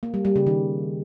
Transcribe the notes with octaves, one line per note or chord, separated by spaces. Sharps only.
A#3
G3
G3
C#3
D#3